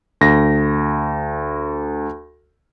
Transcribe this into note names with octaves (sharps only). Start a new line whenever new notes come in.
D2 A#6